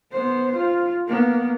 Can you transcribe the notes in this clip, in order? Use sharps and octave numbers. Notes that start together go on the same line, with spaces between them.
B3 C5
F4
A#3 B3